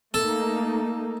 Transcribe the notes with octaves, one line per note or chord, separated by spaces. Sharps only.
A3 A#3 D#4 A4